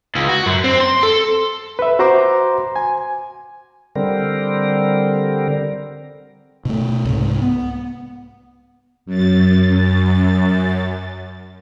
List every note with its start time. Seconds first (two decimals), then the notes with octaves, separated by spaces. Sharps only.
0.15 C#2
0.29 F#4
0.46 F#2
0.64 C4
0.80 C6
1.03 A4
1.79 B4 E5
1.99 F#4 C5 A#5 C6 D6
2.76 G#5
3.96 D3 G3 C4 A#4
6.65 B2 A3
7.05 C2 G#2
7.42 B3
9.06 F#2 A6